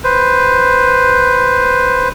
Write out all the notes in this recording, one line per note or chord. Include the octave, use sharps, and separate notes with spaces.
B4 C5